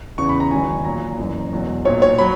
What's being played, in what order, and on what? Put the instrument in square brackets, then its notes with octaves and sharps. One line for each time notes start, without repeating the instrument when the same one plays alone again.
[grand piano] E2 C#3 E3 C#6
B5
A#5
E1 E2 D#3 F#3 G#5
A#1 A#2 F#3 A#5
F#1 F#2 E3
E1 E2 B2 F#3
B1 A#2 F#3 C#5
C#5
F#3 B5